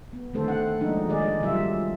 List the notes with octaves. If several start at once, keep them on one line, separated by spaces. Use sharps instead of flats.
B3
D3 D#3 A3 C4 A4 C5
F#5
F3 G#3 A#3 D4 D#4
D#3 G#3 G#4 D5 D#5
C3 F#3 G3 F4 E5